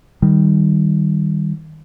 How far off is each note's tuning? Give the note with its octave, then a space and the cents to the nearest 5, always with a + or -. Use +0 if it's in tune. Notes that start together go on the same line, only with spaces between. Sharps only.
D#3 +0 G3 +0